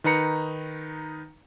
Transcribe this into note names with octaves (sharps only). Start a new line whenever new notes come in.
D#3 D#4 B4 A#5 C#7